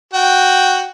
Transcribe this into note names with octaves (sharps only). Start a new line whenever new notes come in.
F#4 G5